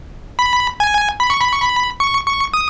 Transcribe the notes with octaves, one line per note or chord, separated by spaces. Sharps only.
B5
G#5
B5
C#6
B5
C#6
B5
C#6
C#6
D#6